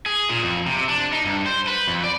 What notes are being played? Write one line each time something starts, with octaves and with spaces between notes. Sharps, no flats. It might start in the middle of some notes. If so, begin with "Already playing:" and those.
G#4
A#2
F2
C3
D4
D#4
G2
C5
B4
F2
D5